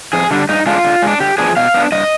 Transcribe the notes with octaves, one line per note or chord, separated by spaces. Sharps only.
F2 G#4
D3 G3 D4
G2 D#4
D3 G#3 D4 F4
D3
G#3 D4
D3 G4
F3 B3 D4 G#4
B2 F5
B3 D4
G2 D#5